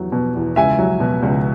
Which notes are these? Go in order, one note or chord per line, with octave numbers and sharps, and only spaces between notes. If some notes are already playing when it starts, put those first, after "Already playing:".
Already playing: E2 F#3
B2
E2
C#2 E5 G#5
F#3
B2
C#2